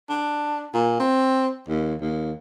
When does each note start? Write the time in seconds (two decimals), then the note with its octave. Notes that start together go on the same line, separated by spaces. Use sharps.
0.09 D4
0.74 A#2
0.99 C4
1.68 D#2
2.01 D#2